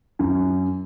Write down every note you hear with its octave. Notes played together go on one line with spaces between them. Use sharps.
F#2